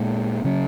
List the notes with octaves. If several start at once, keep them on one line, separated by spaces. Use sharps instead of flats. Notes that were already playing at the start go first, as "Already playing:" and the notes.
Already playing: A#2 G#3 B3
C#3 F#3 C#4